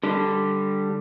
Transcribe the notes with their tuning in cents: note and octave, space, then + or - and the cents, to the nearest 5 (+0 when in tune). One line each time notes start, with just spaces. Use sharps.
D3 +0 G3 +0